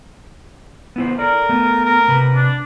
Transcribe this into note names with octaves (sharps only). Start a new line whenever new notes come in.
B3 E4 C5
A4 A#4 D5
A3 B3
A#4
C3 B4
D4